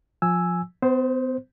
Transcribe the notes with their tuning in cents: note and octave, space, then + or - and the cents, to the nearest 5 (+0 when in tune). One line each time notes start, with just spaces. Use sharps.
F3 +20 G#5 +0 E6 +0
B3 +45 C5 +0